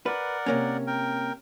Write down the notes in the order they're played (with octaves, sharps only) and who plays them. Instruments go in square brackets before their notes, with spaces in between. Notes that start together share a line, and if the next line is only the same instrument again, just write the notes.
[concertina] A#4 D5 F#5 [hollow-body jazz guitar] B4
[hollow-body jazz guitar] C3 A#3 C#4
[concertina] A#4 G5